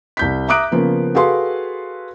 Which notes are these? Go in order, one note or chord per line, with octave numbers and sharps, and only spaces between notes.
C2 G6 B6
E5 A#5 D6 D#6 F#6 D7
C#3 F3 A#3 B3
F#4 G#4 A4 B4 F5 C6